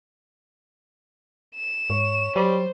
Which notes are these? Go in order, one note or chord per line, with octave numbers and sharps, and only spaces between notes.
E7
G#2 C#5 C#6
F#3 G3 C5